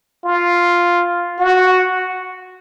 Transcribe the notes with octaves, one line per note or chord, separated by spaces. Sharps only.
F4
F#4